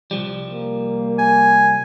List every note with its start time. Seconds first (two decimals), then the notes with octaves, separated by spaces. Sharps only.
0.11 C2 F3 G3
0.49 A#3
1.19 G#5